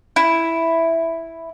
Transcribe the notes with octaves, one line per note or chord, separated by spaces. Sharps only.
E4